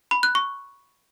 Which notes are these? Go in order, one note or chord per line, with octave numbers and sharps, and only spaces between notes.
B5
F#6
C#6